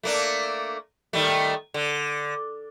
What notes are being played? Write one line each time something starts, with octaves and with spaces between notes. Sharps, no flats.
A3 A#3 D4
D#3 G3 A3
D3